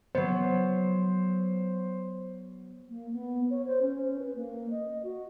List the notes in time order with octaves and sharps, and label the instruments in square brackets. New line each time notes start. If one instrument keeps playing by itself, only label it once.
[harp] F#3 B3 [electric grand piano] C5
[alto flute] A#3
B3
C#5
C5
C#4
B4
A#3
D#5
F#4